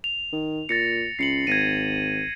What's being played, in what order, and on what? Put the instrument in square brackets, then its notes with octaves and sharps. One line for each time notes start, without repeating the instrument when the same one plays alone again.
[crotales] F7
[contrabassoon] D#3
[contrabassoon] A#2 [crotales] A6 A#6 C#7
[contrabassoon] C#2 [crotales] C7 C#7 F#7
[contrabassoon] G#1 [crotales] G#6 A#6 D#7